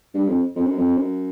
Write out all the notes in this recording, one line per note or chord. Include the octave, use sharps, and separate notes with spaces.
G2
F2
F2
F#2
F2
F#2